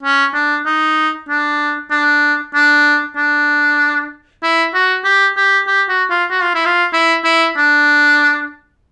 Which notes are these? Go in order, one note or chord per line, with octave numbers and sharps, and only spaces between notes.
C#4
D4
D#4
D4
D4
D4
D4
E4
F#4
G4
G4
G4
F#4
F4
F#4
F4
E4
F4
E4
E4
D4